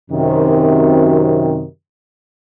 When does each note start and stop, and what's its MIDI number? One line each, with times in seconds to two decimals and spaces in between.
0.11 1.64 42
0.11 1.64 48
0.11 1.64 51